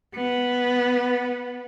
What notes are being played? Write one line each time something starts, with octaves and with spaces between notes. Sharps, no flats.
B3